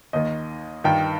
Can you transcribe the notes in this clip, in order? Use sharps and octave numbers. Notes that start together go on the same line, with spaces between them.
D#2 D#3 D#5
G2 D#3 G5